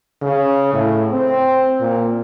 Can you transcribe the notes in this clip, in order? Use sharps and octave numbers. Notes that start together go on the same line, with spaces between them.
C#3
A2
C4
A#2